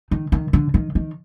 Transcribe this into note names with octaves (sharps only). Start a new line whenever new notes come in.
D#3
D#3
D3
D#3
D#3